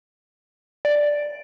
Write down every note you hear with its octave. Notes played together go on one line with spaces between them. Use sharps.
D5